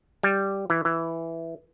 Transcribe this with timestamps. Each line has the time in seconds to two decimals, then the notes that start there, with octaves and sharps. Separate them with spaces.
0.23 G3
0.70 E3
0.85 E3